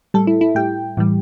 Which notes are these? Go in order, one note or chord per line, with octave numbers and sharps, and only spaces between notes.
A2 G3 A4
E4
E4
A2 G3 G5
A2 E3 G3